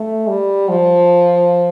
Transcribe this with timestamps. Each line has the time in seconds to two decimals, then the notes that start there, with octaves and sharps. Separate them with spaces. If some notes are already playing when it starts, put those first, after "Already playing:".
Already playing: A3
0.28 G3
0.69 F3